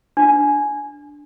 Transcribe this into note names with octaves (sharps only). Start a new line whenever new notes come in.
D4